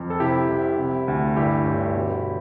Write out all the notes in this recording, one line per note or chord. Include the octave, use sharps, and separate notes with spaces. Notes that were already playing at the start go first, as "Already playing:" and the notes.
Already playing: F2
A4
C3 E4 G4
C2
C3
D2
G2 E4 G4
G1
B2